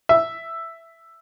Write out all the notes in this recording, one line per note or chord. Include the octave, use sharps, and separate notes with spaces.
E5